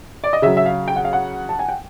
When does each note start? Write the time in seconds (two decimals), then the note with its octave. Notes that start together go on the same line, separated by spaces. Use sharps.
0.24 D5
0.33 D#5
0.42 C#3 F#3 E5
0.57 E5
0.66 F5
0.88 G5
0.96 F#5
1.05 F5
1.13 F#5
1.49 A5
1.59 G#5
1.69 G5